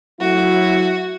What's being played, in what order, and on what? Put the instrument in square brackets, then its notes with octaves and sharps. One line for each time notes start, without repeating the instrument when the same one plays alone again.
[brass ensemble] F#3 A3 E4 [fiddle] F#4